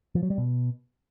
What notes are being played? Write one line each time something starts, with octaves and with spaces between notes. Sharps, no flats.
F3
F#3
G3
B2